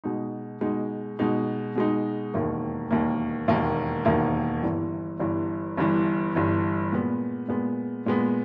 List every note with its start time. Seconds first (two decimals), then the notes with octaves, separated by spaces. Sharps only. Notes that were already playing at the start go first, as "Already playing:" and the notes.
0.04 B2 G#3 D#4
0.61 B2 G#3 D#4
1.19 B2 G#3 D#4
1.75 B2 G#3 D#4
2.34 E1 D#2 D#3 A#3
2.91 E1 D#2 D#3 A#3
3.48 E1 D#2 D#3 A#3
4.05 E1 D#2 D#3 A#3
4.62 G1 G2 E3
5.20 G1 G2 E3
5.77 G1 G2 E3
6.35 G1 G2 E3
6.92 A#2 G#3 B3
7.48 A#2 G#3 B3
8.06 A#2 G#3 B3